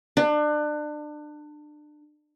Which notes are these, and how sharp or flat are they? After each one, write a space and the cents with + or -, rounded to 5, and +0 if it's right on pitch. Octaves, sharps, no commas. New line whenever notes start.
D4 +30